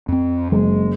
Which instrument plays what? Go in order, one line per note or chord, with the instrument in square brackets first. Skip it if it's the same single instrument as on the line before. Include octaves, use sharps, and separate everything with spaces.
[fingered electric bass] F2 C4
[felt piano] F#1 [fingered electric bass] G#3